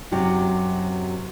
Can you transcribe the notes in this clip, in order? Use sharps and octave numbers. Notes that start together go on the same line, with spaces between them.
F#2 C3 F#3 G4